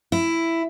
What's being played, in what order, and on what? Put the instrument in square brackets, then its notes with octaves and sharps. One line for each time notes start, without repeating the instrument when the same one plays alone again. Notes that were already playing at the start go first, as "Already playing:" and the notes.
[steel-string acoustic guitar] E4